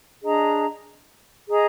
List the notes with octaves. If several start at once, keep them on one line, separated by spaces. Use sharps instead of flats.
D4 G#4 D#5 A#5
G#4 D#5 A#5